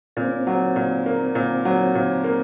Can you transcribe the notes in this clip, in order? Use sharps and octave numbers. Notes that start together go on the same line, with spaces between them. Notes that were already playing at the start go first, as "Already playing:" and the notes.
A#2 C4
C#4
C4
F#3
A#2
A#3
A#2
F#3
A#2
A#3